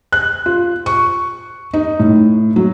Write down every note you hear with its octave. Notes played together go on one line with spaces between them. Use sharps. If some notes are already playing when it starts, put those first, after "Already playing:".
F#6
F4
C#6
D#4
A2
F#3